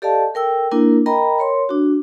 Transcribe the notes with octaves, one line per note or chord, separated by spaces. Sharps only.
G4 A4 D5 D#5 F5 A5
A4 A#4 G5 E6
A#3 D4 E4 A#4
A#4 D#5 G5 A#5 B5
A#4 C#5 C6
D4 F#4